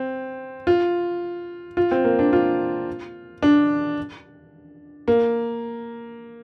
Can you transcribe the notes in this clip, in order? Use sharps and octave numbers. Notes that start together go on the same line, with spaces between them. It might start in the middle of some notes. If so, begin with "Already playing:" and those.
Already playing: C4
F4
F4
C4
A#3
D4
F4
D4
A#3